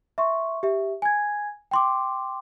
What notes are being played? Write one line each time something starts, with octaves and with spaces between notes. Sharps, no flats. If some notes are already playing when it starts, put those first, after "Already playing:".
E5 C6 C#6
G4 E5
G#5 G#6
G5 C6 D6